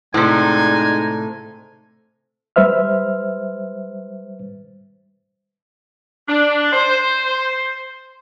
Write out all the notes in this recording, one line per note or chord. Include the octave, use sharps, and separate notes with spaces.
A2 C3 G#3 D#4 D5 G#5
G3 B4 C5 E5 F6
D4
C5